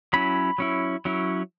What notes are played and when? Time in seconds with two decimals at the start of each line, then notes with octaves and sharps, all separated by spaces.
0.13 F#3 C#4 E4 B5
0.58 F#3 C#4 E4
1.05 F#3 C#4 E4